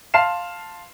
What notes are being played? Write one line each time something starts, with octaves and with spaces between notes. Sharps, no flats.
F5 A5 C6 F6 C7 E7